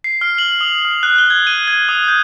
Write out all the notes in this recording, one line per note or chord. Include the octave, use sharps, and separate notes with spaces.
C7
F6
F#7
D#6
F6
F#6
G7
G#6
D#7
G#6
D#6
G6